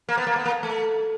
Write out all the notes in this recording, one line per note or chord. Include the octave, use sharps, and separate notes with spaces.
A#3
B3
A#3
B3
A#3
A3